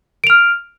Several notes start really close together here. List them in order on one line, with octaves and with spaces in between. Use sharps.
D7 F7 F6